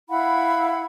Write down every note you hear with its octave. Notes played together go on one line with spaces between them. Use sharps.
E4 F5 F#5 B5